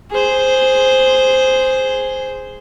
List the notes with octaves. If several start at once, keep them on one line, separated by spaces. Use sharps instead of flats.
G#4 C5